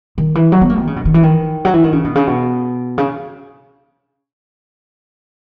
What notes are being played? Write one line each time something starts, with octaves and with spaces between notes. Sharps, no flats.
D#3
E3
F#3
B3
A#3
D#3
C#3
B2
D#3
E3
D#3
F#3
E3
D#3
C#3
B2
C#3
B2
C#3